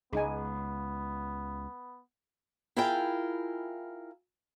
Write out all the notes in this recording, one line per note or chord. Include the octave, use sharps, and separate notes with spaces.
C#2 G#3 B3 D#4 G#5
E4 F4 G#4 A#4 F5 G5